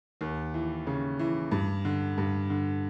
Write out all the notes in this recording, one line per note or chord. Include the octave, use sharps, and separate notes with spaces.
D#2
E3
C#3
E3
G2
D3
G2
D3